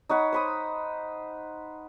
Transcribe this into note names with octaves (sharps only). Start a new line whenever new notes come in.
D#4 C#5 F#5 B5
C5 B5 D#6